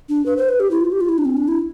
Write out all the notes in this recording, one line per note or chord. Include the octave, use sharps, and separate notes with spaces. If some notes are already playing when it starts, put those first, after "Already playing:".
D4
B4
C5
B4
G4
E4
F4
G4
F4
E4
D4
C4
D4
E4